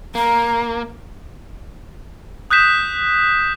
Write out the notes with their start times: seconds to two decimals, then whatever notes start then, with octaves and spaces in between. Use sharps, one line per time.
0.15 A#3 A#5
2.51 D#6 F#6 G6 B6 E7